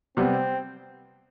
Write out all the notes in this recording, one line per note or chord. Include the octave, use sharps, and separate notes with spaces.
C3 G3 B3 C4